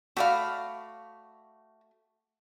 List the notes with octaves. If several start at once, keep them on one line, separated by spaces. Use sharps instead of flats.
A3 F#4 D5 F5 B5